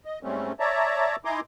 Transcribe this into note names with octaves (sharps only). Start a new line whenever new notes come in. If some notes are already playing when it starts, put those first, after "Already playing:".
D#5
G#2 G3 A3 C4 C#4
C#5 D5 E5 A5 A#5
D#4 E4 G#5 A#5 C6 D6